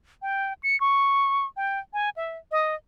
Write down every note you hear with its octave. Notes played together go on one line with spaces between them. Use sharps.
G5
C#7
C#6
G5
G#5
E5
D#5